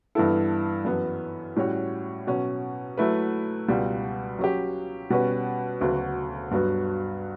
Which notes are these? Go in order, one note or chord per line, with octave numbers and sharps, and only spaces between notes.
G2 E3 B3 E4 A4
F#2 E3 B3
A2 G3 C#4 F#4 C#5
B2 F#3 C#4
F#3 A3 E4 B4
C#2 B2 G3
F#3 C#4 G4
B2 G3 C#4 F#4 B4
D2 C#3 F#3 B3 F#4
G2 F#3 B3 F#4